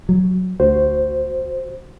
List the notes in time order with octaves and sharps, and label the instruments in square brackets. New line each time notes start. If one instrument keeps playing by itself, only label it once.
[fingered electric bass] F#3
[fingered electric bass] D2 [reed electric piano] F#4 C5